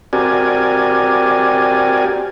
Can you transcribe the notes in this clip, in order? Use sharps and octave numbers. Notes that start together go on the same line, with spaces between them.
C4 F#4 G4 A#4 D5 G#5